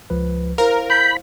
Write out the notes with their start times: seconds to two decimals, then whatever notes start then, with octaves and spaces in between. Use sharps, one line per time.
0.10 C#2 F3 B4
0.58 E4 A#4 C5 F5
0.90 B5 G6